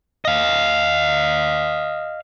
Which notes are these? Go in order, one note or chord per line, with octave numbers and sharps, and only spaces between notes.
D#5 F5